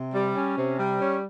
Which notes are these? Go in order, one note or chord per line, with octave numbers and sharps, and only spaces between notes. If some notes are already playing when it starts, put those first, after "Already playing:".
Already playing: C3
G3
C#4
C3
G3
C#4